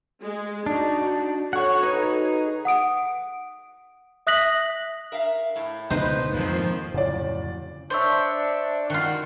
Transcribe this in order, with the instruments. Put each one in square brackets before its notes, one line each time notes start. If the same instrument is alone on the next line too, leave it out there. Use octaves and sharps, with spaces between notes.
[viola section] G#3
[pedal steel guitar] D4 [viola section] D#4 F#4
[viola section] F#4 A4 C#5 [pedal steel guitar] F#5 C#6
[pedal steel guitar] D#4 B4
[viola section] G#4
[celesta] F#5 D#6 D7
E5 D#6 F#6 A#6 B6 F#7
[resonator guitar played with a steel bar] A#4 E5 F5
A2
[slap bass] C#2 B2 D3 [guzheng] D#4 C5 D#5 [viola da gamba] B4
[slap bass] F2 G#2 A#3 [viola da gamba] D#3 F3 C4
[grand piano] D1 D5 [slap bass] F2 C#3 F3
[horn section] D4 [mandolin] C5 C#5 E5
[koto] D#3 F4 [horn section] F#4 F#5